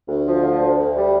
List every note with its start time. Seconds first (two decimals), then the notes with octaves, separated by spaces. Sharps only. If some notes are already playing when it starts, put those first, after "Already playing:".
0.08 D2
0.27 F3
0.43 D3
0.61 D2
0.79 D2
0.96 G3